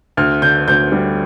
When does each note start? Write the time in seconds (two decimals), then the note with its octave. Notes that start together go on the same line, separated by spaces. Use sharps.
0.17 D2 F6
0.42 D3 G6
0.68 D2 G6
0.92 G3